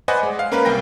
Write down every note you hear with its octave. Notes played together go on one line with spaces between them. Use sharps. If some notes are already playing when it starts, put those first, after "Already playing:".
B4 C5 D5 D#5 F#5 G#5
G#3
F5
A#3 C#4 A#4 B4
C2 G3 G5 A#6